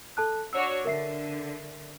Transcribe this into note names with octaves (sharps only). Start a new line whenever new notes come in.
A4 A5 F#6
D4 F#4 C#5 E6
D3 A#4 E5 C7